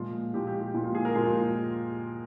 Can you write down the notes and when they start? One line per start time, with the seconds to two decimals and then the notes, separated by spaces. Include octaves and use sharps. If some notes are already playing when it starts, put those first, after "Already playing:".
Already playing: A#2 F3 G#3 F4
0.33 A#2 F3 G#3 G4
0.47 G4
0.60 G4
0.74 A#2 F3 G#3
0.84 F4
0.95 G#4
1.05 A#4
1.15 A#2 F3 G#3 G#4
1.25 F4